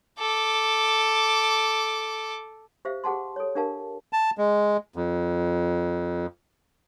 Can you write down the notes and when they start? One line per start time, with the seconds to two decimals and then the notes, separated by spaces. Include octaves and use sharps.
0.19 A4 D6
2.85 G4 C5 E5 F5
3.04 G4 G#4 F#5 A5 C6
3.36 A4 C#5
3.55 D4 G4 A#4 F5 A5
4.13 A5
4.38 G#3
4.96 F2